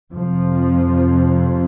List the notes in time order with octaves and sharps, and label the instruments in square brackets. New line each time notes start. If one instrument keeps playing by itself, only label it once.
[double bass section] F2 C3 F3